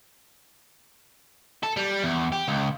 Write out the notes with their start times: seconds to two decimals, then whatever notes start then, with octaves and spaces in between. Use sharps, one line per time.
1.63 A4
1.77 G3
2.03 E2
2.32 G4
2.48 C#2